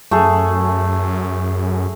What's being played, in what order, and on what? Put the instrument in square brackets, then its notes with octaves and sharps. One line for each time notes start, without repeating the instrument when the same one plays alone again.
[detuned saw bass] F#2 [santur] A3 G#4